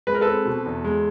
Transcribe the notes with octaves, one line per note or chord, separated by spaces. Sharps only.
G#3 B4
A#4
C4 A4 B4
B2
E2
G#3